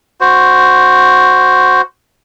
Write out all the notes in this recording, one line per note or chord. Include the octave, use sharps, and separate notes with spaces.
F#4 C5